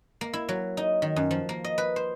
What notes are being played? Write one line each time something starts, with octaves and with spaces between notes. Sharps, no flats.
A#3
E4
F#3
D#4
D#3
F#2
F3
A#3
D#5
B4
C5